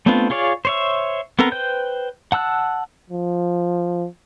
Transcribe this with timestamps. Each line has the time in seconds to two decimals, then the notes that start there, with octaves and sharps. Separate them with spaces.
0.06 A3 B3 C4 D4 F4
0.30 F4 G#4 C#5 D5 F5
0.65 C5 C#5 E5
1.39 B3 C4 A4 A#4 A#5
1.52 B4 C5 G5 G6
2.32 F#5 A5 E6 F#6
3.10 F3